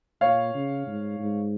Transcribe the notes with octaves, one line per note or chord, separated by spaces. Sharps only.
A#2 C#5 F5
C#3
G#2
G#2